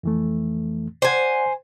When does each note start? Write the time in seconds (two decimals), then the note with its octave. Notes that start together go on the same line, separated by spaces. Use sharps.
0.03 F2 E3 A3
1.02 C5 D5 F#5 G#5